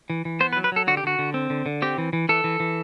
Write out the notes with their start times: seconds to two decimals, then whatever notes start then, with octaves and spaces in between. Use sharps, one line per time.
0.10 E3
0.25 E3
0.40 B3 C5
0.53 B4
0.57 F#3
0.64 B4
0.72 F#3 A4
0.87 D3 F#4
0.97 G4
1.04 D3 F#4
1.19 D3
1.34 C4
1.50 D3
1.66 D3
1.82 C4 G4
1.98 E3
2.13 E3
2.29 E3 A4
2.44 E3
2.60 E3